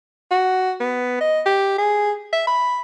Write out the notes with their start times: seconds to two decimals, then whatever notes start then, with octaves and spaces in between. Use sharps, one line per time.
0.31 F#4
0.80 B3
1.21 D#5
1.46 G4
1.78 G#4
2.33 E5
2.47 B5